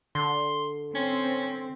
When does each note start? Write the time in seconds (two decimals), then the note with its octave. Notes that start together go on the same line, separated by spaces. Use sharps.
0.15 D3 C6
0.95 C4 C#4